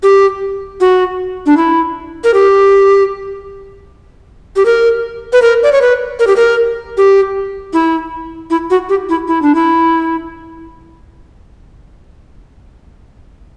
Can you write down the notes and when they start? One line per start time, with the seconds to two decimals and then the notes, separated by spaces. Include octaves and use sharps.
0.03 G4
0.80 F#4
1.46 D4
1.57 E4
2.24 A#4
2.34 G4
4.56 G4
4.65 A#4
5.33 B4
5.42 A#4
5.63 D5
5.72 C#5
5.81 B4
6.19 A#4
6.27 G4
6.36 A#4
6.97 G4
7.73 E4
8.50 E4
8.70 F#4
8.89 G4
9.09 E4
9.28 E4
9.42 D4
9.55 E4